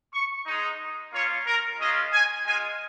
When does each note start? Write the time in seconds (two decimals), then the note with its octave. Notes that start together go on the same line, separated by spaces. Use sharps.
0.12 C#6
0.46 G#3 D#4
1.12 A#3 C#4 F4 C#5
1.46 A#4
1.79 G#3 C#4 F4 D#5
2.13 G#5
2.46 G#3 F4 G#5